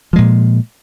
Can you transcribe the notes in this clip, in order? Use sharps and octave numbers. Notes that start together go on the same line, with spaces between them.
A#2 F3 G#3